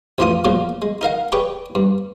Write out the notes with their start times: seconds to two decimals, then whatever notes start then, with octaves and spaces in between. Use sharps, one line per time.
0.18 A1 F2 E3 D4 F4 D#6
0.45 A#2 C#3 F3 F#3 A#3 F4
0.82 G#3
1.01 D#4 A#4 F5 F#5
1.32 G4 G#4 B4 C#5 D5 G5
1.75 G2